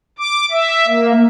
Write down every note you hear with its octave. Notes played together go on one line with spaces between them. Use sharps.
D6
E5
A#3